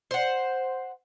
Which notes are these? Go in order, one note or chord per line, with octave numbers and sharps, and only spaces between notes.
C5 F#5